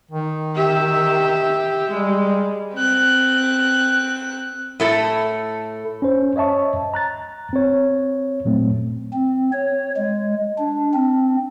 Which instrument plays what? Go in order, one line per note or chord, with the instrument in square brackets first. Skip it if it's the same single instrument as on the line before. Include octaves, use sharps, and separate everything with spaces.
[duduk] D#3
[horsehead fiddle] G4 E5
[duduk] G3 [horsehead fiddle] G#3
[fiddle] C4 F#6
[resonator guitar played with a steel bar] A2 A3 A4
[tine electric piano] C#4 C5
C#5 D#5 E5 A5 C#6
A#5 F#6 A6
C4 C#5
A#2 F#3 A3 C4
[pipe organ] C4
C#5
G#3
D4
C4